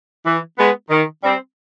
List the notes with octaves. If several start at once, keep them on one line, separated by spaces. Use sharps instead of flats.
E3
G#3 B3
D#3
G3 C4